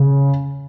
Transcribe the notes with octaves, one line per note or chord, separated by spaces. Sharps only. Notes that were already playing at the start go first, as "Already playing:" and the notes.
Already playing: C#3